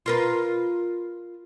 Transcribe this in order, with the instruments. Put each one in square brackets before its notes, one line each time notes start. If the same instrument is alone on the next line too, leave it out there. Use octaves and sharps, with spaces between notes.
[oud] F4 A#4 B4